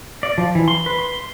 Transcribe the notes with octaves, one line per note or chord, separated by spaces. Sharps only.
D5
F3
E3
C6
B4
C6